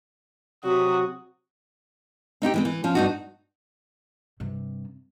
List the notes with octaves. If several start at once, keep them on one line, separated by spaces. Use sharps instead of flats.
C3 F#3 F#4 D#6
C4 D#4 E4 G4
E3 G#3 C4
E3
F3 C#4
G2 D#4 F#4
G2 C3